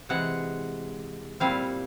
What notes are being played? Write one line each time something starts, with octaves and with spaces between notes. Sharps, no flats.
C3 E3 G#3 F#5
A#2 G3 C4 E4 F5